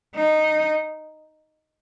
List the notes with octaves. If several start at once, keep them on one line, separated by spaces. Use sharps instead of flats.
D#4